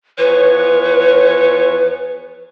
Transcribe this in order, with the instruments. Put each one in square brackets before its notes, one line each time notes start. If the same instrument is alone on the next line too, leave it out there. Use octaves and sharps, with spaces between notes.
[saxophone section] E2 F3 C#5 [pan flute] B4